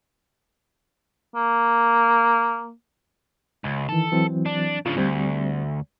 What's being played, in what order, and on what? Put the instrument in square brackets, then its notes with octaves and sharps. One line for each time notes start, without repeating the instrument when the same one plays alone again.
[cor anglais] A#3
[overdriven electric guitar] C#2
[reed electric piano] D#3 E3 [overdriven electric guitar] A4
[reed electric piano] E3 F#3 C4
[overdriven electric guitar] D4
[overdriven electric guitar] C#3 F3 [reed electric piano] D4 F4
[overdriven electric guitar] D2 [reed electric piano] G3 C4